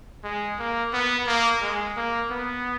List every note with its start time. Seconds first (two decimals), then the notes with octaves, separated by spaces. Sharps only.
0.24 G#3
0.59 A#3
0.93 B3
1.27 A#3
1.61 G#3
1.97 A#3
2.30 B3